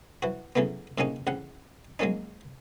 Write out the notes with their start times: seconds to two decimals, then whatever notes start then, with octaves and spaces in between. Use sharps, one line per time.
0.22 E3 F#4
0.56 C#3 E3 F#3 A3 B3
0.98 A2 C#3 A#3 C#4 D#4
1.27 A1 C#3 F#5
1.99 F#3 G#3 A#3 C#4 D#4